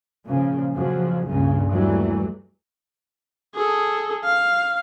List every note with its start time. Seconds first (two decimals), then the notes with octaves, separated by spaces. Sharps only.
0.25 A#2 C#3 F3
0.75 F2 C#3 F3 F#3
1.26 C#2 G2 A#2 C#3
1.72 D#2 E3 F#3 G3 A3
3.55 G#4 A4
4.24 F5